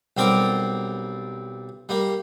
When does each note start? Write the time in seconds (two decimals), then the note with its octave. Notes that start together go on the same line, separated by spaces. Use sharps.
0.17 B1 G3 C4 A#4 D5 D6
1.89 G3 A#3